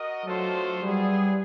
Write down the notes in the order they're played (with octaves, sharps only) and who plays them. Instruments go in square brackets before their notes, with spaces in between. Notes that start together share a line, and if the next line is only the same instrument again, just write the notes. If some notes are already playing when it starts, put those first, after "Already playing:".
Already playing: [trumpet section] F#4 A#4 D#5 F#5
[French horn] F#3 [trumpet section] A3 D4 F4 A4 C5
[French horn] G3 [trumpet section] B3 E4 G#4